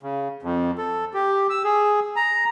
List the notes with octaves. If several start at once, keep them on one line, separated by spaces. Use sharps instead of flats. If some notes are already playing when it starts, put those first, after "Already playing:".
C#3
F2
A4
G4
E6
G#4
A#5